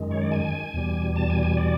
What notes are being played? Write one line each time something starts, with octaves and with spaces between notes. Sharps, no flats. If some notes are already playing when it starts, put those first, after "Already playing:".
Already playing: F#2 D#3 G#3
C#5
D5
G#5
E2 B2 G3
A5
G#5
G#5
D5